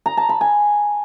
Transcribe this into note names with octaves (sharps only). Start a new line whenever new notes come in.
A#5
A5
B5
G#5